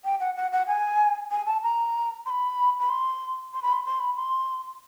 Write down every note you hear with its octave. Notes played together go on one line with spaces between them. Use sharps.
G5
F#5
F#5
F#5
G#5
G#5
A5
A#5
C6
B5
B5
C6
C6
B5
C6
C6
B5
C6